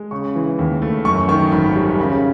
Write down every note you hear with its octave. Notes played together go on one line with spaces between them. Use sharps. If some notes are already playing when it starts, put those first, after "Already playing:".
Already playing: G#3
C#3 C#6
E3
D#2
A3
F#2 C#6
D#3 C#6
G#1 B5
G3
C#3